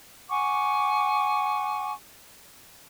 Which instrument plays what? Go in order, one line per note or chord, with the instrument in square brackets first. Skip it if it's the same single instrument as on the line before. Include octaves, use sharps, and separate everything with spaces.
[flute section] F#5 G#5 C#6 D6